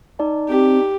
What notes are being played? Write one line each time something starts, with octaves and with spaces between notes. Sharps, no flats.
D#4 D5 A5
C4 G4